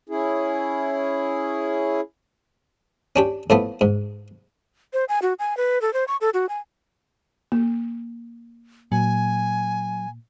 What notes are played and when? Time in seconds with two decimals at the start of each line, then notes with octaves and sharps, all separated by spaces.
0.09 C#4 E4 G#4
3.16 C#4 D4 G4
3.50 A2 F3 A3 B3
3.81 G#2
4.93 C5
5.09 G#5
5.22 F#4
5.39 G#5
5.57 B4
5.82 A4
5.93 C5
6.08 C#6
6.21 A4
6.34 F#4
6.49 G#5
7.52 A#3
8.92 A#2 F#3 G#5